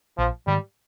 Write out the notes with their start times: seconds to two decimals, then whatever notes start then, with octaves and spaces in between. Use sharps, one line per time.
0.18 A#1 F3
0.47 G#2 D#3 G3